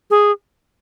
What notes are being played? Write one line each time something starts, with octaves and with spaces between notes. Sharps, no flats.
G#4